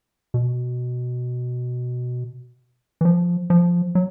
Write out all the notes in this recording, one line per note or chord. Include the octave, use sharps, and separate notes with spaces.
B2
E3
F3
F3
F#3